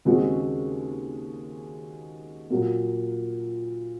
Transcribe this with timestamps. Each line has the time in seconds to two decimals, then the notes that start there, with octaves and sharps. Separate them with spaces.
0.05 D#2 C#3 G#3 C4 F#4
2.50 A#2 F#3 A#3